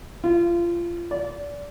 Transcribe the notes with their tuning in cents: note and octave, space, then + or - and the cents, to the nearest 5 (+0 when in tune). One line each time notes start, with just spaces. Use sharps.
F4 -25
D5 -25